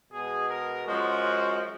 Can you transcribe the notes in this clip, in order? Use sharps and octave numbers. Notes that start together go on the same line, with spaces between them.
B2 G#4
G#3
A#4
F#2 F3 G#3 F#4